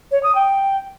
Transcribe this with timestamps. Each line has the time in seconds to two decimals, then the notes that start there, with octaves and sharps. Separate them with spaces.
0.11 C#5
0.23 D#6
0.35 G5